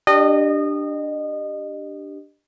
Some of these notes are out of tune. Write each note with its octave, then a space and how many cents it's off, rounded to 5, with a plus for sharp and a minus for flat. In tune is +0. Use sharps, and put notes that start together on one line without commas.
D4 +5 G4 +0 D#5 -25